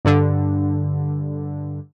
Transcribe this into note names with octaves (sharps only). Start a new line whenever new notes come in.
G2 D3